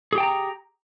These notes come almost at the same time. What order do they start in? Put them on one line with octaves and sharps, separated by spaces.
G#4 G4 G5 A5 A#5